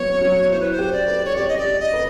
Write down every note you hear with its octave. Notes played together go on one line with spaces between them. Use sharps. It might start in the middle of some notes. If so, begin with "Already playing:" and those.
Already playing: F#3 B3 C#5
F#3
E4 C5
B4
C5
G4
D5
B4
C#5
G4 D5
D#5
D5
G4
D#5
B4